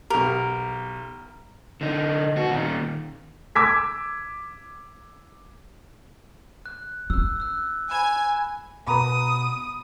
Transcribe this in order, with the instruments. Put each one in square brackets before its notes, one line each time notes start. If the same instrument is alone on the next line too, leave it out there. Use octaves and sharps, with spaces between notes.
[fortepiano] B1 G4 [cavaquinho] A#4
[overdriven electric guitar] D3 D#4
B3 F#4
A#2 D#3
[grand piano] D6 E6 G#6 B6
[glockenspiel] F#6
[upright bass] C#4 [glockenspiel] E6 F#6
[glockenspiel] E6 F#6
[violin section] G#5 [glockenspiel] B5 E7
[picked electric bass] B2 [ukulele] B4 A#5 B5 [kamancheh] D#6